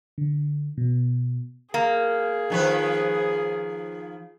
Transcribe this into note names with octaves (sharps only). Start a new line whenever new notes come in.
D3
B2
A#3 G#4
D#3 F3 B4